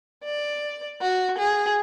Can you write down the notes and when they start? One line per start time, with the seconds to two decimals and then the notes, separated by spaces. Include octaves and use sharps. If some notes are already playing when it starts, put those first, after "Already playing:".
0.24 D5
1.01 F#4
1.38 G#4